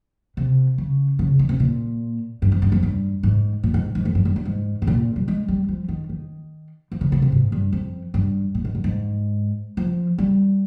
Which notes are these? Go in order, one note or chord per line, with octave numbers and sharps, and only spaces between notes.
C3
C#3
C#3
D#3
C3
A#2
G2
F2
G2
F2
G2
G#2
A#2
G#2
G#2
F2
G2
G2
G2
G#2
G#2
A#2
G3
G#3
G3
F3
D#3
D#3
F3
C#3
C#3
C3
G#2
G2
F2
G2
A#2
G#2
G2
G#2
F3
G3